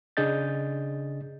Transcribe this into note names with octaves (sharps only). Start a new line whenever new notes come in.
C#3 D4 G#4 D#5 G6 A6